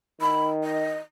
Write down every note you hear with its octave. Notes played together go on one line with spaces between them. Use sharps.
D#3 B5
D#5